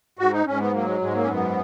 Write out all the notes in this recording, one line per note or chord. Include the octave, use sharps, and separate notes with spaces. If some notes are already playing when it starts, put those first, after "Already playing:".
G#2 F#4
D#4
G#2 C#4
B3
F#3 A#3
G#3
G#2 G#3
A#3
C#4
F#2 B3